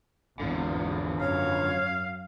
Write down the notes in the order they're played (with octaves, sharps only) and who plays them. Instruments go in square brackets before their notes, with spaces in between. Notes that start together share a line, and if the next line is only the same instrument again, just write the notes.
[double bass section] G#1 E2 [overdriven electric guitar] D3 F3
[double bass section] F#2 [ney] C#5 [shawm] F5